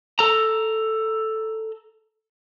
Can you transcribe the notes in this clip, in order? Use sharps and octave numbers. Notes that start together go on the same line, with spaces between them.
A4 A#5